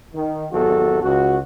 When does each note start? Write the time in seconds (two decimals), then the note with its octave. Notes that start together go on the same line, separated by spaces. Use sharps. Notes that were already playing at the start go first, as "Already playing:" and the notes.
0.14 D#3
0.52 G#1 E2 F#3 F#4 G4 A4
1.02 C#2 F#4